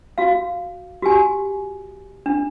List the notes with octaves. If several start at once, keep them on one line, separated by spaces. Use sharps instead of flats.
F#4 F5
F#4 G4 G#5
D4